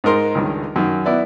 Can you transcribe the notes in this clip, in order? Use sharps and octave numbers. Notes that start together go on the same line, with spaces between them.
G#2 D#4 A#4 C6
C#2 G2 D#3
F#2 D#3
B3 E4 D5